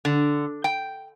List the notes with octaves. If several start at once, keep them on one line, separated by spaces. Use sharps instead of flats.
D3
G5